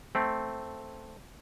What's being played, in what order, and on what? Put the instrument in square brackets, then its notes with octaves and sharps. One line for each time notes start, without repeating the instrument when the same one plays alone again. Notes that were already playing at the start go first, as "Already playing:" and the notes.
[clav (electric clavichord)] A3 C4